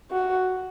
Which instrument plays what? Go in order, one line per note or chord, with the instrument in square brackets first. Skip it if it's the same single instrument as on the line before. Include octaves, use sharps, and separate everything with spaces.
[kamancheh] F#4